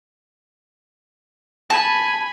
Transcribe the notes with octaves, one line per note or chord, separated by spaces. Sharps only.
G#5 A5 B5